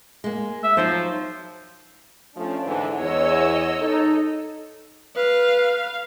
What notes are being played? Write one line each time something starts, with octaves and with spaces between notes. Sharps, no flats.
G#3 A#3
E5
F3 F#3 D#4 C5
F3 A3 C#4 D4
G#2 D3 E3
E2 C#5 D#5 E6
D#4 A4
B4 F5